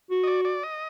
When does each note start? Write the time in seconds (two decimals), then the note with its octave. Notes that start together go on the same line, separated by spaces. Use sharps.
0.10 F#4
0.24 D#5
0.27 D5
0.45 D5
0.63 D#5